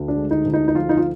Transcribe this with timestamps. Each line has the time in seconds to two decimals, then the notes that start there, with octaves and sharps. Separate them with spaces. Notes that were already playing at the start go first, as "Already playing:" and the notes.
Already playing: D2 D3
0.08 D4
0.16 G#3
0.31 D#4
0.45 D2
0.53 D#4
0.68 D#4
0.75 F3 F4
0.89 D#4
0.97 F4